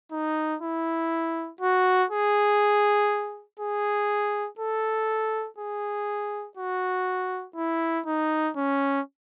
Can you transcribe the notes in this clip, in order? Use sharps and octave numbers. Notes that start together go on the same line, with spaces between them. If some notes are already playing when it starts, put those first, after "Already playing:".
D#4
E4
F#4
G#4
G#4
A4
G#4
F#4
E4
D#4
C#4